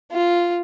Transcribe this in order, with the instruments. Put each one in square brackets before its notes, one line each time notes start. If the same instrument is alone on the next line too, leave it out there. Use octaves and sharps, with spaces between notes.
[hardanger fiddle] F4